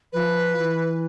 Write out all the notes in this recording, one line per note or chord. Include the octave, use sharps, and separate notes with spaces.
F3 B4
E3